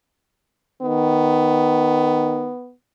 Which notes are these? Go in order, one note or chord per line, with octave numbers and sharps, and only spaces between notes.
D#3 B3